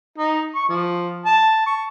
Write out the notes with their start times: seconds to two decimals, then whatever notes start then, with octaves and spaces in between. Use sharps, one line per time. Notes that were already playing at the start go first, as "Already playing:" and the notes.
0.18 D#4
0.55 C#6
0.69 F3
1.26 A5
1.66 C#6